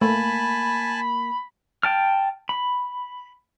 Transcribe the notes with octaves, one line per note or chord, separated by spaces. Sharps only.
A3 A#3 G#5 A5 B5
G5 A5 F6
B5